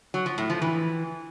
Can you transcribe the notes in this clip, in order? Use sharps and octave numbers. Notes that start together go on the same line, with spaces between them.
F#3
F3
A2
F3
E3